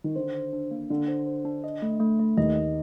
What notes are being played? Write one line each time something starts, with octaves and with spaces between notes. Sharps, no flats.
D#3
D3 C5
C5
D4
A#3
D3 D4
C5
C5
D4
D#5
A3
A3
A3
D#2 D#3 D#5
D#5